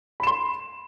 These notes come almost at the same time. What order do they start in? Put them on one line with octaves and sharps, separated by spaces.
B5 E7 C6